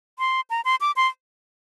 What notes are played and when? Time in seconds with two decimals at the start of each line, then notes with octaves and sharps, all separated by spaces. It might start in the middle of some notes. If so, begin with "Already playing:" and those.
0.19 C6
0.50 A#5
0.65 C6
0.81 D6
0.96 C6